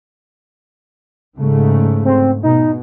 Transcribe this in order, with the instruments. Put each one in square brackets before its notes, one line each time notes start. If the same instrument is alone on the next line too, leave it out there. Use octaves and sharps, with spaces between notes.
[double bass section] G#2 C#3 A3
[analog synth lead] C4
[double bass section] B2 [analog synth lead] D#4